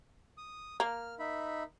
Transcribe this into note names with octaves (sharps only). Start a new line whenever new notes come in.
D#6
A#3 F6
D#4 E5 B5